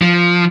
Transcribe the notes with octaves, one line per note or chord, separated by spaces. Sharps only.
F3